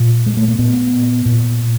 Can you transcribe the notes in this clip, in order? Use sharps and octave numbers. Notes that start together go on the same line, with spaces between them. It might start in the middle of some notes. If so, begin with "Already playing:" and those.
Already playing: A#2
G#3
A3
A#3
A#2 B3
A#2